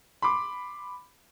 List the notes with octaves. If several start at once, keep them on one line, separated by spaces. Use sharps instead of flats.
B5 C6 D6